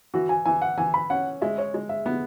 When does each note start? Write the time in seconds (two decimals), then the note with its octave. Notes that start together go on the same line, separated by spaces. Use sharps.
0.14 E3 F#4
0.29 G#5
0.45 E3 G#5
0.62 F#5
0.78 E3 G#5
0.94 B5
1.10 C#4 F#5
1.42 G#3 E5
1.58 C#5
1.74 G#3
1.89 E5
2.06 B3